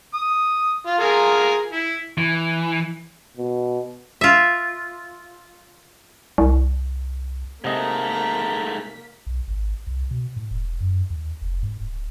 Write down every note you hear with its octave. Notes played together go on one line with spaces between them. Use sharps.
D#6
F4
F4 G#4 A#4
E4
E3
B2
F4 E5
C2
G#2 C3 A3 A#3 D#5 A#5 B6
B1
G#1
C2
B2
A2
E1
F#2
D#2
F1
G#2
D1